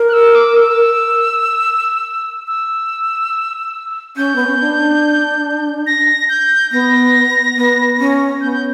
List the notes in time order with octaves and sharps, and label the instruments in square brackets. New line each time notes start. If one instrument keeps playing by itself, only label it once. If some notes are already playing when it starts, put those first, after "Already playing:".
Already playing: [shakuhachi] A#4
[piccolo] F#6
E6
D6
E6
E6
[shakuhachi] C#4 [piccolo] G6
[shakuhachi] B3
C#4
D4
[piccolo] A#6
G6
[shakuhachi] B3 [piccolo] A#6
[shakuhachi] B3
C#4
[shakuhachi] B3 [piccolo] G6
[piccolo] G6